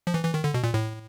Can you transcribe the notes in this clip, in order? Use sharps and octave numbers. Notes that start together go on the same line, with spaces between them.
F3
E3
E3
D#3
D3
B2
A#2
A2